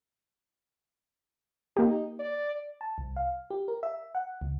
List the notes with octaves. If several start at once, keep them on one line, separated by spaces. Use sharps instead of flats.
A#3 D#4 G4
D5
A5
C2
F5
G4
A#4
E5
F#5
C#2